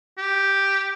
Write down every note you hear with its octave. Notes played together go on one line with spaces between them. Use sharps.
G4